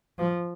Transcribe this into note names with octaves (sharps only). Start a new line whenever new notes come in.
F3